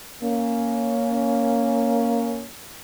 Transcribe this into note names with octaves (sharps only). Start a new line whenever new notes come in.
A#3 C#4